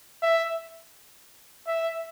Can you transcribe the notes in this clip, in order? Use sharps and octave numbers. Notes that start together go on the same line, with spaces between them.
E5
E5